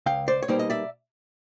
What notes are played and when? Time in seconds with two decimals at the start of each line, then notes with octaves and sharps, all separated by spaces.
0.06 C#2 F5 G5
0.28 C5 D5
0.43 C#5
0.48 B2 G3 A#3 D#4 C5 D5
0.59 D#5
0.70 D5 E5